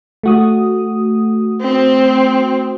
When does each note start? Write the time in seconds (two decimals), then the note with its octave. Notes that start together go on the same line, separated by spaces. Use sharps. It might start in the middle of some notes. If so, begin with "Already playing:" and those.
0.23 A3 F#4 D#6
1.61 C4